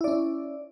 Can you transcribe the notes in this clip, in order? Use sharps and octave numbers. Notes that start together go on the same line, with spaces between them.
C#4 E4 D5